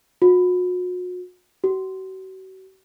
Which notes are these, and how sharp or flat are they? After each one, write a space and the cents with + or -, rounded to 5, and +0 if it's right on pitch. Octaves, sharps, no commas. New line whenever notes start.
F#4 -40
F#4 +40